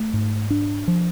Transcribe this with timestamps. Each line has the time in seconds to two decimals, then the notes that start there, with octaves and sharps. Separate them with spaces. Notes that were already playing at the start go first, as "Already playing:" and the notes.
Already playing: A3
0.13 G#2
0.50 D4
0.88 F3